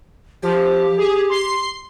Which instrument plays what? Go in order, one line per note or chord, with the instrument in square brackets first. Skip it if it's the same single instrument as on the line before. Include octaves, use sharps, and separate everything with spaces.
[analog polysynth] F3 [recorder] G4
[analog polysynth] G#4
C6 C7